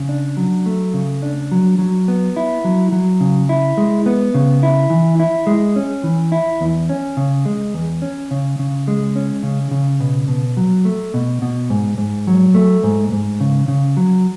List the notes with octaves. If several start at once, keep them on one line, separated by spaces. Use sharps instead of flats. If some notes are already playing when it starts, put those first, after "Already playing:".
Already playing: C#3
D4
F#3
A3
C#3
D4
F#3
F#3
B3
E4
F#3
F#3
C#3
E4
G#3
B3
C#3
E4
E3
E4
G#3
C#4
E3
E4
E2
C#4
C#3
G#3
E2
C#4
C#3
C#3
G#3
C#4
C#3
C#3
B2
B2
F#3
A3
B2
B2
G#2
G#2
F#3
A3
G#2
G#2
C#3
C#3
F#3